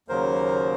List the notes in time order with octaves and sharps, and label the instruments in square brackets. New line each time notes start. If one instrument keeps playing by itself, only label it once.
[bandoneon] D#2 C#3 F#3 A#3 A#4 C5